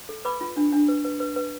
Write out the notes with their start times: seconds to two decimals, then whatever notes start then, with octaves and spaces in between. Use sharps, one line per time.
0.09 A4
0.25 B4 B5 D6
0.41 F4
0.56 D4
0.73 D4
0.88 B4
1.05 B4
1.20 B4
1.36 B4